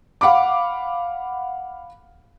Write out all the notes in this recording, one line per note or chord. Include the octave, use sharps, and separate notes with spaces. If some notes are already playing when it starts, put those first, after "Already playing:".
F5 F#5 B5 D6